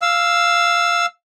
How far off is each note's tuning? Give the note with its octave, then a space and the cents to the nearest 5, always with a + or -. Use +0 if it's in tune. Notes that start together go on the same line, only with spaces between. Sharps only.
F5 -5 E6 +5